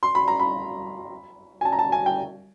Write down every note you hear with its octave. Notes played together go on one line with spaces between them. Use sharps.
C6
B5
A#5
B5
G#5
A5
A#5
A5
G#5
G5